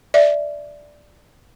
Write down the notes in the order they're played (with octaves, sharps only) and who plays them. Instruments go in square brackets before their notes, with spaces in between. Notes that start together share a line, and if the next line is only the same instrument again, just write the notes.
[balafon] D5 E5